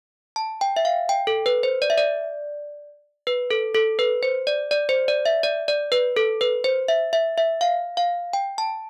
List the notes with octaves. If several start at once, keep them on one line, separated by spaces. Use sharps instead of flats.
A5
G5
E5
F5
G5
A4
B4
C5
D5
E5
D5
B4
A4
A4
B4
C5
D5
D5
C5
D5
E5
D5
D5
B4
A4
B4
C5
E5
E5
E5
F5
F5
G5
A5